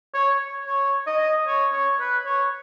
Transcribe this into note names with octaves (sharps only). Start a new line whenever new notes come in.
C#5
C#5
D#5
C#5
C#5
B4
C#5